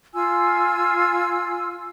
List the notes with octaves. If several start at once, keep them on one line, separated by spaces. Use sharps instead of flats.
F4 G#5 E6